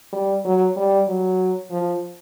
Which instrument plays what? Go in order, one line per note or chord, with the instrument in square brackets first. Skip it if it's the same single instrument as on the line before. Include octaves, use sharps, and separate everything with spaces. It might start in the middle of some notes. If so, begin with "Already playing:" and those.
[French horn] G3
F#3
G3
F#3
F3